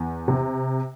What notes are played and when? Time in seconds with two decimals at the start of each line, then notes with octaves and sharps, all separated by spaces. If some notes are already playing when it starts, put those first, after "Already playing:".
Already playing: E2
0.28 C3